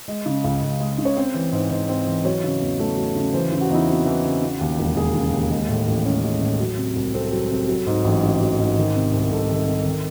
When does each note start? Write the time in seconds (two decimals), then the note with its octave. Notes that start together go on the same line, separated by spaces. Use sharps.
0.08 G#3
0.26 C#3
0.44 C#2
0.62 C#2
0.80 G#3
0.98 C#3
1.05 C#5
1.16 C4 C5
1.34 E3
1.52 G#2
1.71 G#2
1.89 C4
2.07 E3
2.25 F#3 C#5
2.43 C#3
2.61 E2
2.79 A3
2.97 F#3
3.16 C#3
3.33 E3 C5
3.52 C#3
3.61 F#4
3.70 E2 D#4
3.74 E4
3.88 C4 F#4
4.06 E3
4.24 C#3
4.42 C#3
4.61 D#2
4.79 E1
4.97 E1 G#4
5.15 C#3
5.33 D#2
5.51 G#3
5.69 A2
5.88 A1
6.06 C#4
6.24 G#3
6.42 A2
6.60 F#3
6.78 C3
6.96 C2
7.14 C4 A4
7.32 F#3
7.51 C3
7.68 F#3
7.87 G#2
8.05 A1
8.23 A1
8.41 F#3
8.59 G#2
8.77 D#3
8.96 C3
9.13 C2
9.31 C2 A4
9.50 D#3
9.68 C3
9.85 D#3